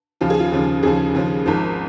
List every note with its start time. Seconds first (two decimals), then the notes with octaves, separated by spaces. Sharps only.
0.21 D#2 C#3 F3 F4
0.30 G#4
0.39 F4
0.52 D#2 C#3 F3
0.83 D#2 C#3 F3 G#4
1.15 D#2 C#3 F3
1.46 G#1 G#2 F3